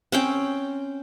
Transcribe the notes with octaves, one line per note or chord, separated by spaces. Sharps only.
C4 C#4 G5